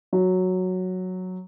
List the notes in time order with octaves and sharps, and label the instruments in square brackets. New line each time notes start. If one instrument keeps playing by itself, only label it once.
[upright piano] F#3